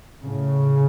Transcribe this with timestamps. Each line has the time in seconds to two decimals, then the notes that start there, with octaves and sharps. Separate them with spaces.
0.25 A2 C#3